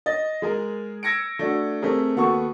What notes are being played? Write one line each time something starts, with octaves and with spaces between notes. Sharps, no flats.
D#5 A6
G#3 G#4 A#4
E6 G#6 A#6 C#7 D7
A3 D4 F#4
A3 C4 G4 G#4 A#4
D#2 B3 F#4 A4 C#6